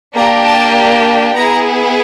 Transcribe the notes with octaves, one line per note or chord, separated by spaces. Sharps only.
A#3 D4 G4 A#5
A5
B3 E4 G#4 A#5